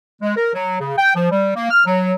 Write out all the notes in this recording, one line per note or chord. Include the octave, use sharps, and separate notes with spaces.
G#3
A#4
F#3
C#3
G5
F3
G3
A#3
F6
F#3